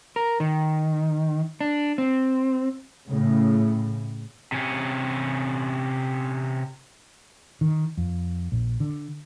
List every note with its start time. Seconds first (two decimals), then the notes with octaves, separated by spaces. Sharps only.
0.16 A#4
0.40 D#3
1.61 D4
1.98 C4
3.08 A2 C#3
4.52 C3 C#4
7.61 D#3
7.97 F2
8.52 A#1
8.80 D3